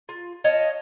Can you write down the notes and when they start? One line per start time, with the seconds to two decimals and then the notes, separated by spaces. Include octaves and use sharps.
0.09 F4
0.44 C#5 D#5 F5 A5